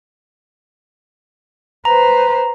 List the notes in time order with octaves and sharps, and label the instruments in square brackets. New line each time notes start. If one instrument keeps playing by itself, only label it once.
[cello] B4 C5 [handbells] A#5